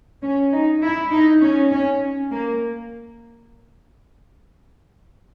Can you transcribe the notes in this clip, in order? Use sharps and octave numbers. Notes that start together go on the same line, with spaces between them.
C#4
D#4
E4
D#4
C#4
C#4
A#3